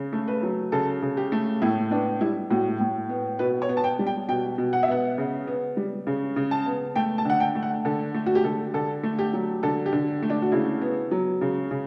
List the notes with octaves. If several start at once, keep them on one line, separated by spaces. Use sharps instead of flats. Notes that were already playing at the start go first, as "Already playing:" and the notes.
Already playing: C#3
A3
B4
F#3
C#3 A4
C#3
G4
A3
A2 E4
B3 D4
G3 E4
A2 F#4
A2
B3
B2 B4
C#5
B3
A5
G5
G3
G5
B2 G5
B2
F#5
E5
B3 F#5
C#3
B3
G3
C#3
C#3
A5
B3
A3 G5
A5
D3 F#5
G5
A3
F#5
D3 A4
A3
F#4
G4
D3 A4
D3 A4
A3
G4
F#3
D3 A4
G4
D3
A3
D4
F#4
C#3 E4
B3
F#3
C#3
C#3